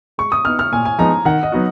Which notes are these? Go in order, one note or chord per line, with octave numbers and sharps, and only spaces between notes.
G#3 C#6
D#6
B3 D#4 F6
F6
A#2 G#5
G#5
F3 G#3 B3 D#4 A#5
D#3 F#5
D#5
F#3 B3 D#4 F#4